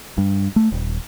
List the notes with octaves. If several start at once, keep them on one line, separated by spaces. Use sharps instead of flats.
G2
A3
D#1